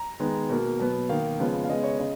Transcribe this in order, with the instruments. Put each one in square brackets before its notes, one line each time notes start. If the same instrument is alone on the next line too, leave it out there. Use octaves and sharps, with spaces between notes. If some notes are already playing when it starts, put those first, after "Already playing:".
Already playing: [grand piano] A#5
D#3 G#3 B3
B2 A#3
B2 F#3 B3
D#3 A#3 F5
C#3 F3 G#3 B3
F5
C#3 G#3 B3 D#5
C#5
C#3 D#5